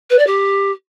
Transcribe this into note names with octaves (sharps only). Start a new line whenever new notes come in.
B4
D5
G4